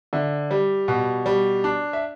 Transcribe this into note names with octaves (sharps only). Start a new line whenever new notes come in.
D3 E5
G3
B2
G3
D4
E5